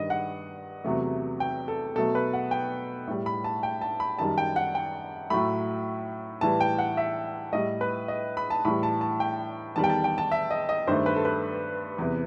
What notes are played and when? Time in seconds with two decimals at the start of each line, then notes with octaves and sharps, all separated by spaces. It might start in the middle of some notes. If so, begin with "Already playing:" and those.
Already playing: G2 D#3 G3 D#5
0.10 F#5
0.84 E2 C3 F#3 A3
1.40 G5
1.68 A4
1.96 B2 F#3 A3 A4
2.15 B4
2.33 F#5
2.51 G5
3.07 A2 G3
3.26 B5
3.44 A5
3.63 G5
3.81 A5
4.00 B5
4.19 F#2 D#3 G3 A5
4.38 G5
4.56 F#5
4.75 G5
5.30 A2 F#3 A3 B5
6.41 A2 E3 G3 A5
6.60 G5
6.79 F#5
6.97 E5
7.52 A2 G3 D#5
7.81 B4
8.08 D#5
8.37 B5
8.50 A5
8.65 A2 E3 G3 B5
8.83 A5
9.01 A5
9.20 G5
9.76 E2 D#3 G3 A5
9.84 G5
9.90 A5
10.04 G5
10.18 A5
10.32 E5
10.51 D#5
10.69 D#5
10.87 G2 D#3 A3 C5
11.06 B4
11.16 A4
11.25 B4
11.98 E2 C3 E3